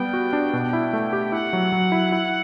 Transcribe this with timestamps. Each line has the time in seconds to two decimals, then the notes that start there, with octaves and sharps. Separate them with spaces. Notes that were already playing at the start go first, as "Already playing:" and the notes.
Already playing: G3 B3 G5
0.13 F#4
0.33 D4
0.53 B2
0.73 E4
0.93 A3
1.13 G4
1.32 E4 F#5
1.53 F#3
1.72 F#3
1.92 E4
2.12 E4